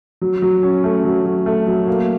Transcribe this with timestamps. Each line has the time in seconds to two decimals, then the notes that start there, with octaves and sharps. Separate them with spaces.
0.21 F#3
0.42 F#3
0.63 C#4
0.84 A3
1.05 F#3
1.25 F#3
1.46 A3
1.67 F#3
1.87 A#3